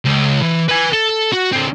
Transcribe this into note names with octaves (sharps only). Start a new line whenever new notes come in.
C#2
E3
B4 G#5
A4
F#4
D3 C4